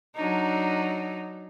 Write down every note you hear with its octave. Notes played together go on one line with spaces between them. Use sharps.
F#3 D4 D#4